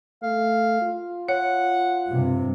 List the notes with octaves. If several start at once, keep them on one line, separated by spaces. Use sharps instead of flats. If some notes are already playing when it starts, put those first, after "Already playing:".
A3 F5
F4
C#5 F#5
G2 C3